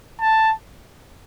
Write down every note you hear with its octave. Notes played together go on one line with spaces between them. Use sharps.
A5